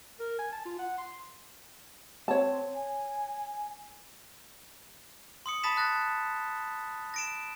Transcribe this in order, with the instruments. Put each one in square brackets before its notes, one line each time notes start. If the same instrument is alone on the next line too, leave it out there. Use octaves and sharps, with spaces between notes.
[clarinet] A#4
G#5
A5
F4
F#5
C6
[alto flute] C4 [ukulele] C#5 A5
[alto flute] G#5
[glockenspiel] C6 D#6 C#7
A5 B5 D#6 A6 B6 E7
A5 F#6 A6 A#6
A#6 D7 E7